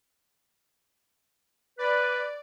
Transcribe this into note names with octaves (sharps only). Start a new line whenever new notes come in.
B4 D5